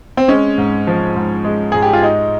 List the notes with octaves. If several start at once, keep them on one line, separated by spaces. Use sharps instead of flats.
C4
G#3 C#4
G#2
F3
G#2
G#3
G#2 G#4
G4
F4
G#3 D#4